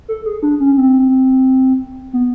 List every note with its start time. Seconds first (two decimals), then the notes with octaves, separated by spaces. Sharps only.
0.08 A4
0.26 G#4
0.43 D4
0.60 C#4
0.77 C4
2.13 B3